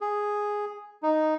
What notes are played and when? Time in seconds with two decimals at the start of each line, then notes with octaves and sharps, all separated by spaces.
0.01 G#4
1.03 D#4